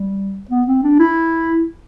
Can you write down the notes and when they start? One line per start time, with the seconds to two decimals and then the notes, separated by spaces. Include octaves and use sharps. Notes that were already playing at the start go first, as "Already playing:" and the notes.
Already playing: G3
0.51 B3
0.67 C4
0.83 D4
1.00 E4